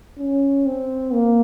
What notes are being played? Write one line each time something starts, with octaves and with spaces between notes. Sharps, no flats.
C#4
C4
A#3